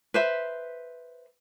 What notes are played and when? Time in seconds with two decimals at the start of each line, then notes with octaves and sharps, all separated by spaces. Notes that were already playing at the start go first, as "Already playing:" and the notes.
0.14 B4 C5 E5